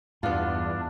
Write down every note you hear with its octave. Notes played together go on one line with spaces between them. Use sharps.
E2 G2 B3 D4 F4